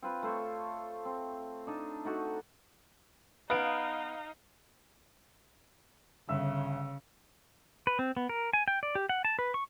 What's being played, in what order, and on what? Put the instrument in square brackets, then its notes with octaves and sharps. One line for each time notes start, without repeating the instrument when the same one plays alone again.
[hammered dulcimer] C4 F4 B4
A3 C5 C#5
C4
D4 D#4 A5
A3 D#4 F#4 D5
[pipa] B3 [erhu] D#4 [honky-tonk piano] F5 D7
[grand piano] G1 E5 E6 [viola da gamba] C#3
[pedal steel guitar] B4
C4
B3
A#4
G#5
G5
D5
G4
F#5
A5
B4
C#6